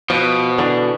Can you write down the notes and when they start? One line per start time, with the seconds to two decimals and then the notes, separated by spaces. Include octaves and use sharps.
0.10 B2 F3
0.59 D3 E3 D4